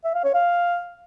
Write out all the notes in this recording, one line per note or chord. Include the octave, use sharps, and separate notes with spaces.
E5
F5
C#5
F5